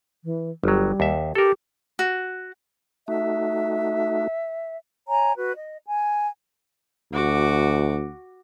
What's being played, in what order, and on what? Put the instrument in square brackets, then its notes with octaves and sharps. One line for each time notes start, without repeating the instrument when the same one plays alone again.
[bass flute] E3
[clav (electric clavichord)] G1 F#3 [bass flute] G3
[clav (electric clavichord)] D#2 E5
[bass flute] G4 [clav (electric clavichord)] A4 A#4
[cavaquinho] F#4
[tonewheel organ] A3 D#4 F#4 [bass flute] E5
[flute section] C#5 G#5 A#5
F#4 B4
D#5
G#5
[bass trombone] D2 [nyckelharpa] F#4 D6